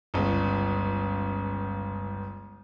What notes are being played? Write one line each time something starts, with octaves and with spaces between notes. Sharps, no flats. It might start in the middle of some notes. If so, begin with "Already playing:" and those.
G1 C#2